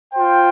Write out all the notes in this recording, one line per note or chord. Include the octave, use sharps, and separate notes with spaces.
F4 C5 G5